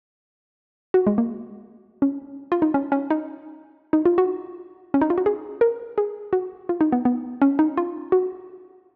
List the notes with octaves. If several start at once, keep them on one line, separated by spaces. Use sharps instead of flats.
F#4
G#3
A#3
C#4
F4
D#4
C#4
C#4
D#4
D#4
F4
F#4
C#4
D#4
F4
F#4
G#4
A#4
G#4
F#4
F4
D#4
B3
B3
C#4
D#4
F4
F#4